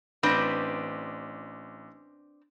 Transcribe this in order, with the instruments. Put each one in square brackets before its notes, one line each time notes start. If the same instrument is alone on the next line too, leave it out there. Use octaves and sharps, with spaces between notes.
[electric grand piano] A1 A#6 [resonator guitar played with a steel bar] C4 D4 B4